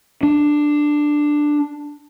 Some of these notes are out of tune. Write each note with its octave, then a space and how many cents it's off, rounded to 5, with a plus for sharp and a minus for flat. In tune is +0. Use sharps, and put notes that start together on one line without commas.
D4 +10